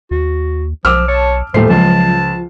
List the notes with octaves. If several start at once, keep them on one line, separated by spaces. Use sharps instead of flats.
D#2 F#4
B1 F3 D6 E6 F6
C#5 A5
D#1 A2 F3 A3 C5 C7
C#2 F3 F#3 A5